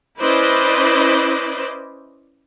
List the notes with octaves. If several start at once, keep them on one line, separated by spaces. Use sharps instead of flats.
C#4 E4 B4 C5 D5 D#5